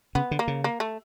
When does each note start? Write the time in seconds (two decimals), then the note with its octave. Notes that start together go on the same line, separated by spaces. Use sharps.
0.15 C#3 B3
0.31 D3
0.39 A#3
0.48 C#3
0.64 A#3
0.80 A3